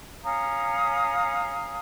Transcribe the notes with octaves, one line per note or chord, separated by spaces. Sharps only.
C#4 F5 A#5 D#6